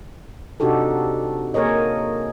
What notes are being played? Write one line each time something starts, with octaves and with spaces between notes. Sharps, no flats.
C3 D4 D#4 F#4 G4 A4
A#3 G#4 A#4 C#5 D#5